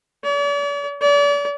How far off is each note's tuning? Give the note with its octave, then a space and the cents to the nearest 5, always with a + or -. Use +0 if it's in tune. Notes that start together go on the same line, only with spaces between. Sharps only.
D5 -45
D5 -40